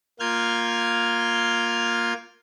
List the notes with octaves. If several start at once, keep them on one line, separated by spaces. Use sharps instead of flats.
A#3 F4 F6 G6 G#6